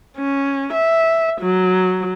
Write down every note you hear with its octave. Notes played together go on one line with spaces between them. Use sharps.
C#4
E5
F#3